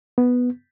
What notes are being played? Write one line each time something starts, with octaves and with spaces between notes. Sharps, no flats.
B3